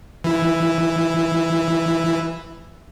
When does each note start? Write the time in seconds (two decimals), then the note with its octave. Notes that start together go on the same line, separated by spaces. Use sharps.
0.24 E3 E4